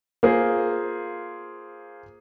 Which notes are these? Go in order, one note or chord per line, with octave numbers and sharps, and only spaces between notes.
A#3 F4 G#4 C5